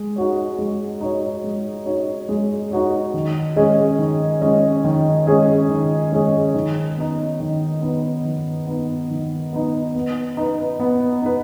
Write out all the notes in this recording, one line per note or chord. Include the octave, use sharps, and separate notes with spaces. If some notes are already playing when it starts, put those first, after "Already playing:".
Already playing: G#3
D#4 F#4 C#5
G#3
D#4 F#4 C#5
G#3
D#4 F#4 C#5
G#3
D#4 F#4 C#5
D#3
G#3 C#4 G#4 D#5
D#3
G#3 C#4 G#4 D#5
D#3
G#3 C#4 G#4 D#5
D#3
G#3 C#4 G#4 D#5
D#3
B3 D#4
D#3
B3 D#4
D#3
B3 D#4
D#3
B3 D#4
B3
D#4 B4
B3
D#4 B4